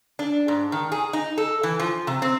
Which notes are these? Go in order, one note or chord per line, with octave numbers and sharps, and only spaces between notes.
D4
G#2
D#3
G#4
D#4
A4
E3
F3
C3
C4